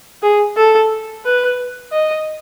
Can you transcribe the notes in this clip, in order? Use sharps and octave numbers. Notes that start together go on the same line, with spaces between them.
G#4
A4
B4
D#5